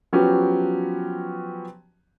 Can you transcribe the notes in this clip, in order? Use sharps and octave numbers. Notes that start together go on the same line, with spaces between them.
F3 F#3 B3 C#4 F#4 G4